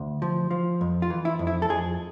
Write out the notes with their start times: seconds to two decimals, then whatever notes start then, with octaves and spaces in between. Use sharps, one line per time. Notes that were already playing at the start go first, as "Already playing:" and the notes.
Already playing: D2
0.22 F3
0.51 F3
0.81 F2
1.02 F4
1.10 E3
1.25 E4
1.39 F2
1.47 E4
1.62 A4
1.69 F2 G#4